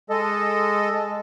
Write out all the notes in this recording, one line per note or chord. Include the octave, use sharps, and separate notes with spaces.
G#3 A4 D#5